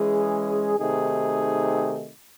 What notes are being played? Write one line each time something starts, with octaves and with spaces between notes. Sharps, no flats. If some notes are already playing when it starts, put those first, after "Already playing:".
Already playing: E3 G#3 C#4 G#4
C3 D#3 A3 D#4 G#4